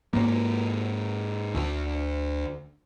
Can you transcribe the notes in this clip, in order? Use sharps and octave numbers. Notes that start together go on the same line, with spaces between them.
G#2 A#3
D2